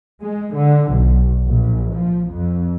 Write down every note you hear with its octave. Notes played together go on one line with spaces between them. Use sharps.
G#3
D3
B1
A#1
F3
F2